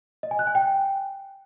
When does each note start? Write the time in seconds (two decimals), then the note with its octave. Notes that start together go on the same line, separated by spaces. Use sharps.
0.23 D#5
0.31 G#5
0.39 F#6
0.47 G#5
0.55 G5